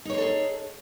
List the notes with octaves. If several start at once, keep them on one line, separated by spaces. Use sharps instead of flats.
D#4 G#4 A4 C5 C#5